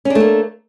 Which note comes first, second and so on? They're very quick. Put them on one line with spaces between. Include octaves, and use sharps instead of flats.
C#4 D4 A3 A#3